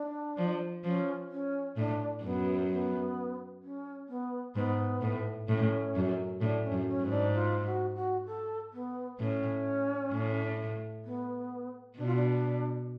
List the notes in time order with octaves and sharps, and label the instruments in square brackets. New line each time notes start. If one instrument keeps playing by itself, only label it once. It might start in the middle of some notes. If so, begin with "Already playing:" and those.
Already playing: [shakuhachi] D4
[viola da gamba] F3
[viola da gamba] F3 [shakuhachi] C#4
[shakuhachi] C#4
[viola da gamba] A2 [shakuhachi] D4
[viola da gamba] F#2 [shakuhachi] B3
[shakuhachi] B3
C#4
B3
[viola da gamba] G#2 [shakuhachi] B3
[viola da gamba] A2
[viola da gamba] A2 [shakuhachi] C#4
[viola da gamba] F#2
[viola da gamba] A2 [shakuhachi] D4
[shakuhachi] C#4
[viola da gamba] F#2
[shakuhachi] C#4
[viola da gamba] G#2
[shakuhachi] D4
F4
F#4
F#4
A4
B3
[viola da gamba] A2 [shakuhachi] C#4
[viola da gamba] A2
[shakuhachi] B3
[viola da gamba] B2 [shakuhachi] D4
[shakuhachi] F4
D4